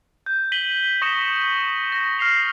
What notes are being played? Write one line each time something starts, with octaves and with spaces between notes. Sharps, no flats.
G6
B6 D#7 F#7 G7
C#6 D#6 A#6 B6 C#7 E7
A#6
F6 A#6 C7 F7